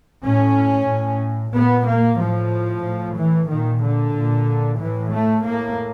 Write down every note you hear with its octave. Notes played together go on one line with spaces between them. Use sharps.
A2 C#4
A2
A#2 B3
A#3
A2 F3
A2
E3
A#2 D#3
D3
A#2
A2 E3
A3
A2 A#3